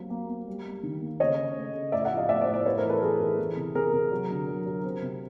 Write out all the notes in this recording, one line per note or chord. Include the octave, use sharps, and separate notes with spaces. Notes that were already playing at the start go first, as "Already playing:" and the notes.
Already playing: F#3 A#3 C4
A#3
A#3
G3
G3
D#3
A#3
C#3 C#5 D#5
C#3
A3
C#3
A2 D5 E5
E5 F#5
F3
D#5 F5
A2 D5 E5
C5 D5
A2
C5 D5
C4 B4 C#5
A#4 C5
E3
A4 B4
E3 G#4 A#4
E3
E3
C3
C3 G#4 A#4
C3
F#3
D3
F#3
F#3
C4
C3